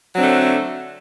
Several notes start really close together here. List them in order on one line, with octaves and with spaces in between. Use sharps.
F#3 D4 C4 D3 A3